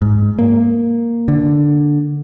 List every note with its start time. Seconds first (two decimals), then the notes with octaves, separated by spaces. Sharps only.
0.02 G#2
0.39 A#3
1.28 D3